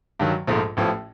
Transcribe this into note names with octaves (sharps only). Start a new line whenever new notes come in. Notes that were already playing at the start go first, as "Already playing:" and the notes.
G2 D#3 F#3
A#1 G#2 F3 A3
A1 A2 F3